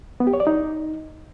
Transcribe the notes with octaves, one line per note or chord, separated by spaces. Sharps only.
B3
G4
C#5
D5
D#4